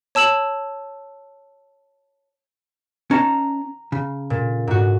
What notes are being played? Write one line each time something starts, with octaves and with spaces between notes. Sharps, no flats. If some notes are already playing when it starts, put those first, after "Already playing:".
C#5 A5 E6 E7 F#7
C#4 D#4 A5 A#5
C#3
A#2
G#2 F#4